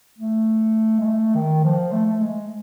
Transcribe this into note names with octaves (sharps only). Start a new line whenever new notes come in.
A3
G#3
A3
D#3
F3
A3
A3
G#3